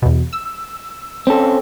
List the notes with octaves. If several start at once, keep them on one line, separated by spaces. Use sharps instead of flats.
E2 B2
E6
C4 C#4 A4